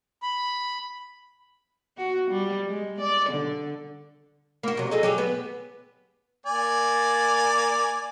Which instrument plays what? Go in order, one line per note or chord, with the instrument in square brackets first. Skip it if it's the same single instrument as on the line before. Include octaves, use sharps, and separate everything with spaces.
[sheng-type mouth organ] B5
[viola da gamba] F#4
G3
G#3
D5
D3
[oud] A#3 F#4
C3 F#3
D#4 G#4 A4
F#3 G4 G#4
B3
[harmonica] A#3 D5 G#5